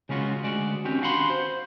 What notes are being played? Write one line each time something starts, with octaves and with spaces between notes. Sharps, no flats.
C#3 G#3 C#4 F4 F#4
D2 G#3 F#4 D5
D#3 C4 C#4 F#4 G4
D4 F#4 F5 F#5 B5 C6
C5